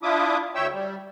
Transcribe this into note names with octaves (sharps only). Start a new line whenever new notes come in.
D4 E4 F4 E5 D6 D#6
D2 C#5 E5 G5 E6
G3